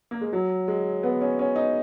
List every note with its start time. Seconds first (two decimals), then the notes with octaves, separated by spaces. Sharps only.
0.11 A#3
0.21 G#3
0.33 F#3
0.68 G#3
1.03 B3
1.21 C#4
1.39 C#4
1.56 D#4